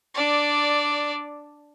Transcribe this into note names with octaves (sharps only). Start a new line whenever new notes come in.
D4 D5